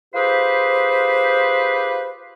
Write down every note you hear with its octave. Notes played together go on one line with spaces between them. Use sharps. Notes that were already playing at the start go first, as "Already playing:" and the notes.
F4 G4 G#4 B4 C5